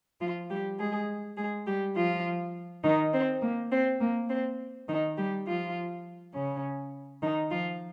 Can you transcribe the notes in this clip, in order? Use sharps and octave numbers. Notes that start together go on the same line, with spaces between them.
F3 F4
G3 G4
G#3 G#4
G#3 G#4
G3 G4
F3 F4
D#3 D#4
C4
A#3
C4
A#3
C4
D#3 D#4
G3 G4
F3 F4
C#3 C#4
D#3 D#4
F3 F4